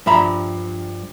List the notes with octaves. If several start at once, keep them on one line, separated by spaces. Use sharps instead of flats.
G2 F3 E5 A#5 B5